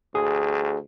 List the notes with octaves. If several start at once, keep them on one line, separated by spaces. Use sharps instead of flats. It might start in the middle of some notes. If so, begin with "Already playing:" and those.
D2 G#4